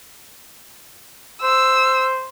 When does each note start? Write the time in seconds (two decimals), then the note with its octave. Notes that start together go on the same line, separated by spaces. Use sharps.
1.42 C5 E6